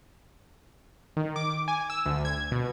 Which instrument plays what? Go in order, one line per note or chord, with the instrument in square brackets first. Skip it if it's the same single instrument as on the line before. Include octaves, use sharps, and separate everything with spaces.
[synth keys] D#3
D6
G#5
E6
D2
G#6
B2